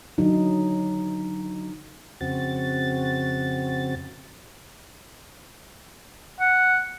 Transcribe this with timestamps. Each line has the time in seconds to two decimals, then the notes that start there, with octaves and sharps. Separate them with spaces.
0.18 D3 F#3 D#4
2.21 F2 C#3 C4 F#4 A6
6.40 F#5